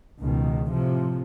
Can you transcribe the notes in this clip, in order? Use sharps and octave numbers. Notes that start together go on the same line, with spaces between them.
C#2 B2 D#3
A2 C3 F3